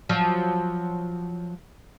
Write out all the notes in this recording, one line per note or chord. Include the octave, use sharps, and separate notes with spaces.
F3 F#3